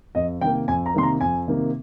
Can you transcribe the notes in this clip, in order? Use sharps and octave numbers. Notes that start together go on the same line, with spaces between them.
F2 D#5
C3 D#3 A#3 G5
F2 G#5
A#5
C3 D#3 A#3 C6
A#5
F2 G#5
C3 D#3 A#3